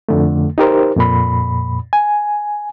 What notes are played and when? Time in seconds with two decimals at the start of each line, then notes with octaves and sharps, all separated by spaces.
0.09 F2 D3 A3
0.58 D#4 G4 A#4 C5
0.96 F2 A#2 B5
1.93 G#5